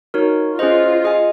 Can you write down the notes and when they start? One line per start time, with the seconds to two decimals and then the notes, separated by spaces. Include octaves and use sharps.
0.14 D#4 F#4 A#4 C#5
0.59 C#4 F4 G#4 C5 D#5
1.04 G#4 D#5 G#5